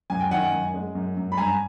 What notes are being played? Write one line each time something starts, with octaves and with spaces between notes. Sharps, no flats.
F#2 G#5
G5
D#3 F#5 G#5
F#2
G#3
F#2
F#2
B5
G2 G#5 A#5